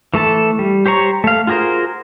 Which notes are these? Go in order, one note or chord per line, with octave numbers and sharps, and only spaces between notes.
E3 A3 A4 A5
G3
G4 C5 C#5 A#5 C#6
A3 F5
F4 F#4 G#4 A#4 C5